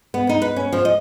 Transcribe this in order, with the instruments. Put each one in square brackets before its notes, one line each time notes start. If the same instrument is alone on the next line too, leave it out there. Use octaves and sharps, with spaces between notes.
[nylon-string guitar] B3
D#4
B4
C#4
F3
D#5